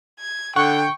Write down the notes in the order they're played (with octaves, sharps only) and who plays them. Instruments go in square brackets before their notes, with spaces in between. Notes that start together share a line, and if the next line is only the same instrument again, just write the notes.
[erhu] G#6
[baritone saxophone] D3 [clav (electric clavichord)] F#5 [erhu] G5 [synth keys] C#6